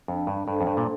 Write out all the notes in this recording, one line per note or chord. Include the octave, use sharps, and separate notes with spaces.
F2 D4
G2
G2 A4 C5
F2
G2
A#2